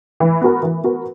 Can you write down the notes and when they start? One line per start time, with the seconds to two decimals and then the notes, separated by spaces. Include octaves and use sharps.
0.20 E3
0.41 B3 F#4 A#4
0.63 E3
0.84 B3 F#4 A#4